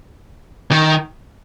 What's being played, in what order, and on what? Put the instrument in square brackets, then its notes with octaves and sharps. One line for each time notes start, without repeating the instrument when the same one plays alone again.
[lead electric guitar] D#3